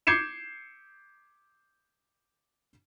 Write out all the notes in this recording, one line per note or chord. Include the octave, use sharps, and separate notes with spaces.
D6 G6 G#6 C7 C#7 E7